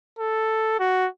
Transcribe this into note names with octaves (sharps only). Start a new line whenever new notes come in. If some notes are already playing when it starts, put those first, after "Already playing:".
A4
F#4